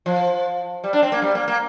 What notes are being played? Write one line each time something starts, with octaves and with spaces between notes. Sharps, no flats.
F3
G3
D4
C4
A#3
G3
A#3
A#3